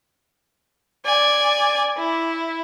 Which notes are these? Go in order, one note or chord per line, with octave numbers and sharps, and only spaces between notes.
D5 G#5
E4